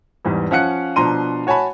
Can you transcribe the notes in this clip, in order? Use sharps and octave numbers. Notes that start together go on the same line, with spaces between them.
E2 G#2 E3 G3
F3 C#4 F5 F#5 F#6 C#7
B2 F3 D4 A#5 C6 D#7
F#4 C#5 G#5 A5 B5